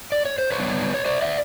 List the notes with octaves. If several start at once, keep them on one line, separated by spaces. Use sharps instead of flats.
D5
C#5
C5
B4 C#5
D3 G3 B3 D4
C#5
C5 D5
D5 E5